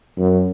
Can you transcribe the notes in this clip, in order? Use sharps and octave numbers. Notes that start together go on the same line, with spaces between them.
F#2